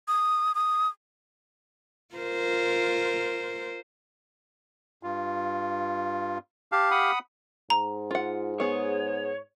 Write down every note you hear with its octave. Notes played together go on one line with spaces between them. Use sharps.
D#6
D#6
F4 A#4 C5
G2 F4
G4 F5 A5
F#5 B5 D#6
G#2 A#5
F4 F#5
B3 G#4 C#5